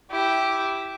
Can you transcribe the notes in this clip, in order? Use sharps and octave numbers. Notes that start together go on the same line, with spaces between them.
E4 G4